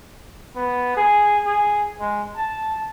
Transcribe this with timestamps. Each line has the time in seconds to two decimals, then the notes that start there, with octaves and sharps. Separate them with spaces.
0.56 B3
0.97 G#4
1.45 G#4
2.00 G#3
2.36 A5